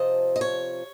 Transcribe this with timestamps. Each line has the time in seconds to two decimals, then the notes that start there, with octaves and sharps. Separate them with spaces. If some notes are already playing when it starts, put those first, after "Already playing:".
Already playing: F2 C3 F3 D#5
0.36 D#5
0.41 C#5